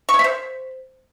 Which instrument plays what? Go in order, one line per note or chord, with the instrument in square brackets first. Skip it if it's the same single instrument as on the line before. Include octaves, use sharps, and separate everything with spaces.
[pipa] C#6
C#5
E5
C5